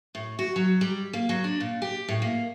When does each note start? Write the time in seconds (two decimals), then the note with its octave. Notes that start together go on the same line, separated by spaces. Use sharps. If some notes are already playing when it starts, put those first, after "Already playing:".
0.15 A2
0.39 F#4
0.56 F#3
0.81 G3
1.13 A#3
1.29 F#3
1.44 D4
1.60 A#2
1.82 G4
2.08 A2
2.22 A#3